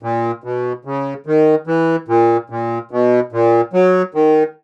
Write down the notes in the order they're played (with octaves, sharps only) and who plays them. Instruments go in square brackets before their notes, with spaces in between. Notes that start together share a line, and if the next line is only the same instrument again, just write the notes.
[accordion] A#2
B2
C#3
D#3
E3
A#2
A#2
B2
A#2
F#3
D#3